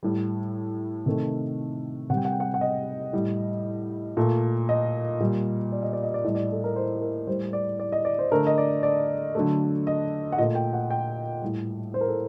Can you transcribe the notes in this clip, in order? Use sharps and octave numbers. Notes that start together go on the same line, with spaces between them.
A2 G3
C3 D#3 A3
C3 G3 F#5 G5
F#5
G5
F#5
F#5
D#5
A2 G3
A#2 A3
D#5
A#2 G3
D5
D#5
D5
D#5
D5
A2 G3 D#5
D5
A4
A#4
C5
A#4
A2 G3 C5
D5
D5
D#5
D5
C5
D3 A3 A#4
D#5
D5
D5
D3 F#3 A3
D#5
F#5
A#2 A3 D#5
G5
F#5
G5
A2 G3
C5
A#4
A4